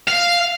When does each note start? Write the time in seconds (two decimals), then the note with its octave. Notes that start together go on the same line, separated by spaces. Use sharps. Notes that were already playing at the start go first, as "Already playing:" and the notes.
0.08 F5